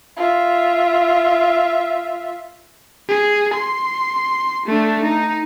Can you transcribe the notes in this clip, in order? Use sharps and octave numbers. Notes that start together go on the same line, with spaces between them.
F4 E5
G#4
C6
A3 D4
D#4